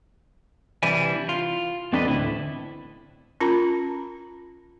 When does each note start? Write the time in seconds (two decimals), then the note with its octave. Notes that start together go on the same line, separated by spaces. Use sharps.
0.83 C2 E3 G3 D4 E4 G#5
1.29 F4
1.93 E2 C4 D4 A4 B4 D#5
2.08 D2 A2 E4
3.40 C#4 F4 A#4 A#5 B5